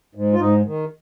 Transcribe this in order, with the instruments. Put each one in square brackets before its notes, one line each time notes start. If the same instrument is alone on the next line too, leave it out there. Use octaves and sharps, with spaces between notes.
[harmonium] G#2
F4
G#2 D#4
D#3